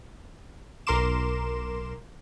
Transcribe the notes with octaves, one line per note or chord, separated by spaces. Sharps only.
B1 A#4 A#5 C6 D6 E7